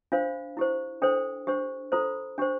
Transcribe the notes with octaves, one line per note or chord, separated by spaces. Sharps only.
D4 F4 C5 F5
E4 G4 C5
D4 A4 C5 G5
D4 G4 C5
F4 A4 C5 A#5
D4 G4 C5